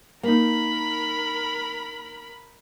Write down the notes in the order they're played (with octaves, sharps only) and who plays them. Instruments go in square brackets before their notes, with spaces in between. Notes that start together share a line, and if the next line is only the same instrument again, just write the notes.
[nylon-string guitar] A#3 D#4 [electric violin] A#4 B5